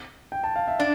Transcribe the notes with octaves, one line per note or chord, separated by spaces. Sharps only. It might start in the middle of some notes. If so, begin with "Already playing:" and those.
G5
A5
F5
E5
D4 D5